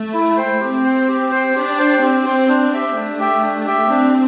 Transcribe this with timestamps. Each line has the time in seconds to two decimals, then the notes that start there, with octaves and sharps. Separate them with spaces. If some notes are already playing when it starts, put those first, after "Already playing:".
Already playing: A3
0.14 E4
0.37 C5 G5
0.61 C4 G4
0.84 C5 G5
1.08 G4
1.31 C5 G5
1.55 D4 G4
1.79 C5 G5
2.02 C4 G4
2.26 C5 G5
2.49 D4
2.73 G4 E5 G5
2.96 A3 D4
3.19 G4 E5 G5
3.43 D4
3.67 G4 E5 G5
3.90 C4 D4